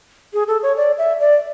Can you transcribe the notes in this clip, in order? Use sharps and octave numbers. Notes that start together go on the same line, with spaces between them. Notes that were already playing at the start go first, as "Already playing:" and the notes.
G#4
A4
C#5
D5
E5
D5